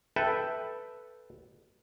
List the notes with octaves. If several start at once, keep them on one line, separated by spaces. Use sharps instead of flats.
A4 B4 E5 G5